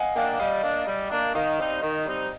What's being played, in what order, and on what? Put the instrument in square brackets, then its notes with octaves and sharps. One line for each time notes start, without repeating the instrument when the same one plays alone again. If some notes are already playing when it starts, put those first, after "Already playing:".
Already playing: [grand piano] D#5 F5 F#5 G#5
[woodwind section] A#3 D4 [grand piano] F5 G5
[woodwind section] G3 [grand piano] D#5 F5
[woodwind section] A#3 D4
G3
A#3 D4
[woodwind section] D#3 [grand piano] D#5 F5
[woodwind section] G3 C4 D#4
D#3
G3 C4 D#4